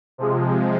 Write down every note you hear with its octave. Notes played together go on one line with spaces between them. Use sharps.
C3 F3 G#3